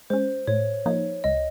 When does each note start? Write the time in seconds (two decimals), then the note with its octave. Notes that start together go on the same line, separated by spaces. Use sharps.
0.10 G#3 C#4 C5
0.47 A2 C#5
0.86 F3 A#3 D#4 C#5
1.24 C#2 D#5